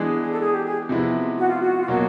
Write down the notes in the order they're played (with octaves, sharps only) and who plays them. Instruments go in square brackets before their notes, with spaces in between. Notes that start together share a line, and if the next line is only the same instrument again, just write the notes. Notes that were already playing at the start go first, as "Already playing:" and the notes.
Already playing: [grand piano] E3 G#3 B3 D4 [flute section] G#4
[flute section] A4
G#4
G4
G#4
[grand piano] C3 F3 G#3 B3 E4
[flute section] F#4
F4
F#4
F4
[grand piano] B2 F#3 A#3 [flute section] F#4